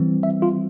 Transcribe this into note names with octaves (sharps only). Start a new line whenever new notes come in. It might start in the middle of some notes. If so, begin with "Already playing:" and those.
Already playing: E3 G3 C4
E5
F4